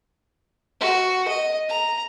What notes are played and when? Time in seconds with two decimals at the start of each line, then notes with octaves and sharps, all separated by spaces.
0.80 F#4
1.28 D#5
1.69 A#5